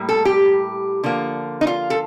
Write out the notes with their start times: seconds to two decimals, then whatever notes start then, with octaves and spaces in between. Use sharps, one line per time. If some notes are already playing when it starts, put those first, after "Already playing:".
Already playing: A2 G3 A#3
0.09 A4
0.25 G4
1.04 D3 F3 A#3
1.61 D#4
1.67 F4
1.90 A4